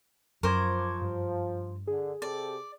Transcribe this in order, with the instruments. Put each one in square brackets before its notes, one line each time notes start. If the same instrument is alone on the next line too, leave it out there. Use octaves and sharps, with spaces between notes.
[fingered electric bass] F#2 [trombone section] F3 [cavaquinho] A#4 C5 [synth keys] C#6 D6 G#6
[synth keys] G2
[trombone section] D3 [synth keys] G#4
[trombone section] C3 G4 A4 [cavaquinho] D5